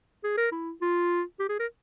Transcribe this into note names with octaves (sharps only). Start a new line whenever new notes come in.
G#4
A#4
E4
F4
G4
G#4
A#4